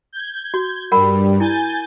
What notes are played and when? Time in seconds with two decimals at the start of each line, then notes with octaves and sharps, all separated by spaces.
0.13 G6 G#6
0.54 F#4
0.92 G2 G3 A#4 F#5 B5
1.40 E4 G#5 G6 A6